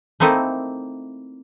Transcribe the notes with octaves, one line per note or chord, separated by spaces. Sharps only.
A3 A#3 C4 D#4 E4